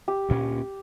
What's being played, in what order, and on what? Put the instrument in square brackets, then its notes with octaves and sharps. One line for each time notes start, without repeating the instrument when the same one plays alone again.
[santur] G4
[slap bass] D2 A#2 C#4